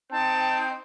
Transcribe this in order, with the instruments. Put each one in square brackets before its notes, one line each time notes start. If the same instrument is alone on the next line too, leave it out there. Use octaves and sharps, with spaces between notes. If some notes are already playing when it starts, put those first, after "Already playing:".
[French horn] C4 [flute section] D#4 G5 G6 [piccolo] A5